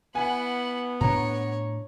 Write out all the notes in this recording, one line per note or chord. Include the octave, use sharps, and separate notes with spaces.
B3 E4 F#5 G#5
A2 D4 C#5 A#5